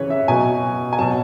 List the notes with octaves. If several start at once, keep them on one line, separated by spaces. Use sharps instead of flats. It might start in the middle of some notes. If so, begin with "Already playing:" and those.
Already playing: C#3 E3 B4 C#5
E5
B2 F#3 G#5
G#5
B2 F#3 A5